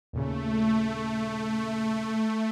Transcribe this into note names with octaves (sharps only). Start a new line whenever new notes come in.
D#2 A#2 C#3 A3